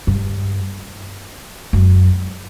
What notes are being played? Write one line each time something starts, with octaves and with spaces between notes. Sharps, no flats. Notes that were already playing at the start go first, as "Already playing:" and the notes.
G2
F#2